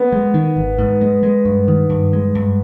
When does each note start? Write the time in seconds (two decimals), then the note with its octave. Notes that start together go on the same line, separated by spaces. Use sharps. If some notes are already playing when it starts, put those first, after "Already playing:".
Already playing: B3
0.12 G#3
0.34 D#3
0.57 G#1
0.78 G#2
1.01 G#3
1.23 G#3
1.45 G2
1.68 D#3
1.90 G2
2.13 G#3
2.35 G2